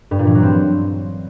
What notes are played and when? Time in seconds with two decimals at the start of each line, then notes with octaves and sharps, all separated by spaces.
0.11 G2
0.19 A#2
0.27 E3
0.35 F#3
0.43 C4